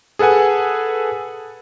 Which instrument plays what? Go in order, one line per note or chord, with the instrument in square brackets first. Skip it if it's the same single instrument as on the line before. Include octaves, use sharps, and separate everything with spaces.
[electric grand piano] G#4 A4 B4 F#5 G#5